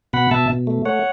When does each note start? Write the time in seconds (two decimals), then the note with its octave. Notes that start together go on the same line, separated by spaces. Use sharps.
0.13 B2 F#5 B5
0.31 B2 E5 A5
0.49 B2
0.67 A3
0.85 A3 C#5 F#5